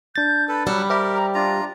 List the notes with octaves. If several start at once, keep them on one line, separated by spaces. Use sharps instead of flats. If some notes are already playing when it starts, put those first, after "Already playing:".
D4 G6 A6
A4 B4 B5
F#3 G3 F#5 E6
G4 A#4 C5 E5 G5
A#5
D4 F4 A#5